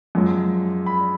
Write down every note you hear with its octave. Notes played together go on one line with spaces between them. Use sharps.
F#2 F3 G#3
B5